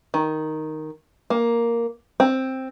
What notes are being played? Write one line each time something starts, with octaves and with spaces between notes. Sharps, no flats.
D#3
A#3
C4